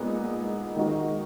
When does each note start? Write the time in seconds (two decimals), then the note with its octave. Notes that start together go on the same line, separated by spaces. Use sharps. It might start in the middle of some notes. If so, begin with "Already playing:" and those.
Already playing: A#2 G#3 B3 D#4
0.75 D#3 G#3 D#4 F#4